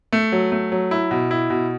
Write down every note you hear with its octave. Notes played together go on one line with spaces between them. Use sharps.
A3
F#3
A3
F#3
E4
B2
E4
B2